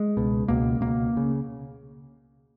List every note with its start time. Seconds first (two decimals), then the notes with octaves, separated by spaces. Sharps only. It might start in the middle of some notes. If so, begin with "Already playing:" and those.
Already playing: G#3
0.17 C#2 B2
0.48 C#2 B2 A#3
0.81 C#2 B2 A#3
1.17 C#3